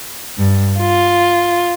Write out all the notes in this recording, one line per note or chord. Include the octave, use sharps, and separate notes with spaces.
G2
F4